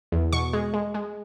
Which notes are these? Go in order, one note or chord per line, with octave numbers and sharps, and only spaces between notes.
E2
B2 C#6
G#3
G#3
G#3